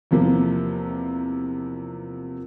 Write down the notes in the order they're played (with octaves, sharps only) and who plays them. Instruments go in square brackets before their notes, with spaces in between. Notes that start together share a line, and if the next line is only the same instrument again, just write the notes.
[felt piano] E2 C3 F3 A#3